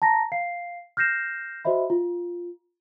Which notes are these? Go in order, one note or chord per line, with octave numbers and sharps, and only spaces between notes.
A5 A#5 A#6
F5 C7
F6 G6 A#6 C7 E7
F#4 C5 D#5 E5 B5
F4